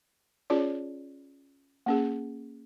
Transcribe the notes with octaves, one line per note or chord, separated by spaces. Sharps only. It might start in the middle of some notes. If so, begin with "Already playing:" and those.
C#4 F4 G#4 C#5 D5
A#3 C#4 G#4